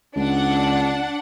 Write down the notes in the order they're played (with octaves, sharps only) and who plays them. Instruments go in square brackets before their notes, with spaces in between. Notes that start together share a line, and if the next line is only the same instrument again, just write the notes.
[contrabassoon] C#2 [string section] D4 F#5